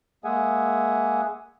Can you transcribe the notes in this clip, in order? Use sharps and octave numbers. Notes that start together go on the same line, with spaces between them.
G#3 A#3 G#4 E5 F#5 G#5